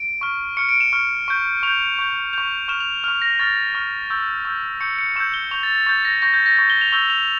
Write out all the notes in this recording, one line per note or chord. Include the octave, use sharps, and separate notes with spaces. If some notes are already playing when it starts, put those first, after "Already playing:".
Already playing: D7
C#6 F6
C#6 F6 C#7
D7
E7
C#6 F6
C#6 G6
C#6 G6 F7
C#6 G6
C#6 G6 F7
C#6 F6 E7
F7
C#6 F6 F7
A#6
C#6 F6 A6
C#6 F6
C#6 E6 G6
C#6 E6 G6
C#6 E6 G6 C#7
C#7
C#6 E6 G6 E7
G7
C#6 G6 F7
A6
A6
C#6 G6 A6
A#6
C#6 G6 A#6
G6
A#6
C#6 G6
G7
F7
C#6 E6 G6 G7
F7